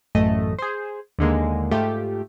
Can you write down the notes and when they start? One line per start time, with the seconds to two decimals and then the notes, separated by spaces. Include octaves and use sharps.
0.15 A1 F#2 A3 D#5
0.59 G#4 C5
1.19 D#2 D3 G#3 A#3
1.71 G#2 A3 F4 G4